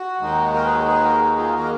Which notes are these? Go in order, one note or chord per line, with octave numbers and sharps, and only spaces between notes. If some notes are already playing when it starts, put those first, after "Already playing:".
Already playing: F#4
D#2 D#3 G#3 D#4
F#4 A#4
G#4 B4
F#4
G#4 B4
F#4 A#4
F#4
F4 G#4
D#3 A#3 F#4 A#4
D#5